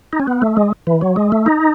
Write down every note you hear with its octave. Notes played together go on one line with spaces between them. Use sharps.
D#4
C#4
B3
A3
G#3
E3
F#3
G#3
A3
D#4